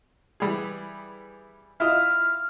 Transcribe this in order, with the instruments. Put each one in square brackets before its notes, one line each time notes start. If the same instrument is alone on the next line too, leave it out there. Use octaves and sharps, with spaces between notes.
[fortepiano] E3 G3 G#4
[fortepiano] E4 F4 D#5 [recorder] F6